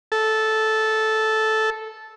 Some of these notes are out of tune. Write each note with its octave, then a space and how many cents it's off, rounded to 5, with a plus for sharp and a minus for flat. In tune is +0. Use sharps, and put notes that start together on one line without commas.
A4 -10